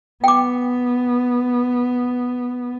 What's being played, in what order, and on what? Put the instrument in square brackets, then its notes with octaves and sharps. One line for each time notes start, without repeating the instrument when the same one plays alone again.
[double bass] B3 [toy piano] G5 D6